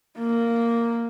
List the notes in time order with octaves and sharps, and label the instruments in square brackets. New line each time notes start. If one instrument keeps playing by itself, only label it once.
[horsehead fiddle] A#3